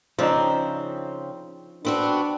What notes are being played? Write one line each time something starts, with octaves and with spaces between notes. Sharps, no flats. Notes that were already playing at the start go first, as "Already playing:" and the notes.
C#3 F3 C4 D4 D#4
B3 C4 D4 F#4